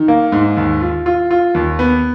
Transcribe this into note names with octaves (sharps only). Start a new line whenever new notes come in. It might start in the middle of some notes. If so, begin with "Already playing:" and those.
Already playing: D#3
A#3
G#2
D#2
F4
F4
F4
D#2
B3